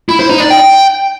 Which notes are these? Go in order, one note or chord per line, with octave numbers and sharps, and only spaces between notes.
E4
C5
D#4
D5
G5